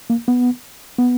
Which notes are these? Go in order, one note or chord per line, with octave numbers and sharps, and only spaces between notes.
A#3
B3
B3